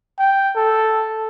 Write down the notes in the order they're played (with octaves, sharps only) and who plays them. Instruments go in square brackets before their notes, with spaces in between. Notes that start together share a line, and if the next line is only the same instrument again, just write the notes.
[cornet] G5
A4